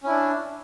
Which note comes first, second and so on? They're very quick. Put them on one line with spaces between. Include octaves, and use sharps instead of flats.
C#4 E4 D4